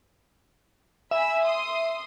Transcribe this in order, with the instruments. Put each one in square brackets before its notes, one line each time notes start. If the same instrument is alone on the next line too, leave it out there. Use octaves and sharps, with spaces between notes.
[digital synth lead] E5 [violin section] G#5 B5 E6
[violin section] C6 D#6